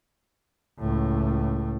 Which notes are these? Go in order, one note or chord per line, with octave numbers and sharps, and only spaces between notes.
C#2 A2